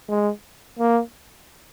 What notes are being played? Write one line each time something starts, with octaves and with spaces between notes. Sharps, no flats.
G#3
A#3